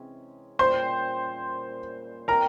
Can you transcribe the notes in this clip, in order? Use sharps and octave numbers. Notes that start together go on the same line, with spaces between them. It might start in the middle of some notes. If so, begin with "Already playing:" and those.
Already playing: C3 E3 G#3 C#4
A#2 G3 A#3 C#4 C5 C6
E3 G3 C4 A#4 A#5